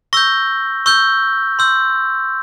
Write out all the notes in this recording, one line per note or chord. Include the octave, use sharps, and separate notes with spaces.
C#6 E6 G6 A#6
C#6 E6 G6
C6 E6 G6